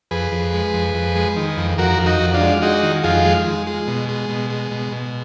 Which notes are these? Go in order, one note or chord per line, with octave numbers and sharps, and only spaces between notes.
F2 G#4 B4
F2
G#3
F2
F2
G#3
D#3
F2
F2 F#4 A#4
F2
D#4 F#4
F2
D4 F4
G#3
G#3 D#4 F#4
D#3
F2 F4 G#4
G#3
G#3
G#3
B2
G#3
B2
G#3
B2
B2